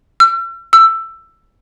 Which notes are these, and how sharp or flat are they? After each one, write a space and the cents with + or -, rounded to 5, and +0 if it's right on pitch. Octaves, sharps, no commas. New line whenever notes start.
E6 +45
E6 +15